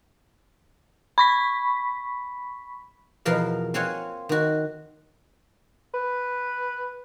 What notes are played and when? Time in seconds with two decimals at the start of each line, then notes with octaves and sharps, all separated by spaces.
1.18 B5 C#6 B6
3.25 E2 B2 F3 A#4 F5
3.74 C4 F4 C#5 F#5 G#5
4.29 D#3 F#4
5.94 B4